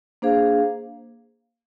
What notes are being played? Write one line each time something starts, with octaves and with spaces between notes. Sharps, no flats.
A#3 D4 G#4 C5 F5